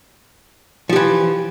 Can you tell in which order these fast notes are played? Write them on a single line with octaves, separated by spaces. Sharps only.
F3 G4 E3